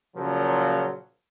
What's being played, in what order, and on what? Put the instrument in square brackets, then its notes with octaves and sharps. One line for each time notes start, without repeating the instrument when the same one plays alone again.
[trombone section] A#2 C#3 F3 F#3 A#3